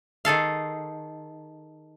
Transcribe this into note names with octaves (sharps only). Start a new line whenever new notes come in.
D#3 G#4 A4 F5